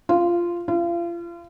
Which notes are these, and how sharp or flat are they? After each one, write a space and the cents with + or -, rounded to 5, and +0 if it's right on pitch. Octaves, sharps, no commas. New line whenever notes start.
F4 -10
F4 -35